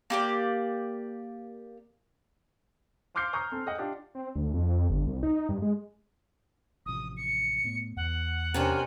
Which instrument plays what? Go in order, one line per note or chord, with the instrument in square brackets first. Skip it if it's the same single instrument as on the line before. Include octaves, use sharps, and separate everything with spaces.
[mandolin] A#3 G4 D5
[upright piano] F5 C6 D6 F6 G6 C7
G#5 A#5 C#6 D#6 F6 G6
C4 A4
G#4 D#5 F#5
D4 F4 G4 F#5
[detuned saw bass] C4
D2
F2
G1
C2
D#4
G2
G#3
[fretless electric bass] A1 C3 F3 [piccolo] D#6
[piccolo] C#7
[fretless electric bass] A2 A3 B3
[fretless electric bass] E2 [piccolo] F#5
[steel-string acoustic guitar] C3 C#4 D4 [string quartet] A#4 C5 G#5